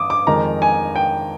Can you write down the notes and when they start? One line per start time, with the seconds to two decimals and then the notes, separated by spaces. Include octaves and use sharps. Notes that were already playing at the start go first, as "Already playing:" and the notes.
Already playing: G2 D6 D#6
0.10 D6
0.27 F2 D#3 G#3 A#5
0.62 G#5
0.96 G5